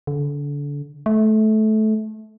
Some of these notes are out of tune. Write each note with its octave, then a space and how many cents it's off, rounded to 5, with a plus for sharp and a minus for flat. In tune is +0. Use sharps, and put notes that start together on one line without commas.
D3 -30
A3 -20